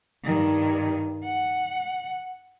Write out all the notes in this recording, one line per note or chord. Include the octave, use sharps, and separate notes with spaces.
G2 D#3
F#5